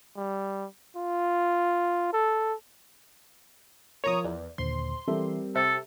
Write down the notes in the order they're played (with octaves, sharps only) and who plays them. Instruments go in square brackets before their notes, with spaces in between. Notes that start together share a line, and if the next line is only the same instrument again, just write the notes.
[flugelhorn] G3
F4
A4
[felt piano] F3 A#4 [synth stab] C#5 A#5 D#6
[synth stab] E2 [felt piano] D5
[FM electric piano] D#2 A#2 D3 [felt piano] C5 [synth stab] C6
[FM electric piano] E3 A4 E5 [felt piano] G3 C4 A#4
[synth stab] C3 [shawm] A4 [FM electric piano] C5 E5